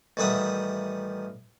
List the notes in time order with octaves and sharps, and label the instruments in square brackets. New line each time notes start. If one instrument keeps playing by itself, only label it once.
[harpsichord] A1 D#3 G3 E5 F#5 D#6